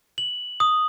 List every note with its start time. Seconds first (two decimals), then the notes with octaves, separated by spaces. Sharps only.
0.18 F#7
0.60 D#6